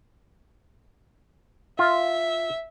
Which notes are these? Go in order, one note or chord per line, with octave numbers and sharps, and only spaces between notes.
F4 E5